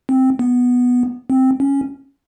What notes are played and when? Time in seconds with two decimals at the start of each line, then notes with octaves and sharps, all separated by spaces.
0.09 C4
0.39 B3
1.30 C4
1.60 C#4